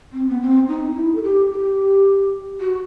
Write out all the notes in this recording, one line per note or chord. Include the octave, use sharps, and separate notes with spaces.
C4
B3
C4
D#4
E4
A4
G4
G4
F#4